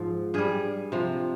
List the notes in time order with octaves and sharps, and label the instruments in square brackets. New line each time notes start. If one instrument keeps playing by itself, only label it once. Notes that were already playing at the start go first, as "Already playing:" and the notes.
Already playing: [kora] G#2 F3
G2 G3 G#4
C3 F3